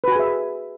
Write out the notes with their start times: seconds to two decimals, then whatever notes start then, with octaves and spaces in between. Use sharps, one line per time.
0.04 B4
0.08 F#4
0.12 G#5
0.16 G#4
0.20 E5